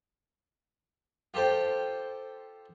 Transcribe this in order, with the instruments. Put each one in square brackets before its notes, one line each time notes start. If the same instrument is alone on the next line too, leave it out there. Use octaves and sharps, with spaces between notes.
[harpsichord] F4 G4 A4 C5 G5